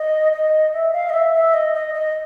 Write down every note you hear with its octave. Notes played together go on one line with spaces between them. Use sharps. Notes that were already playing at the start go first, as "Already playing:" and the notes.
Already playing: D#5
D#5
E5
F5
D#5
E5
E5
D#5
D#5
D#5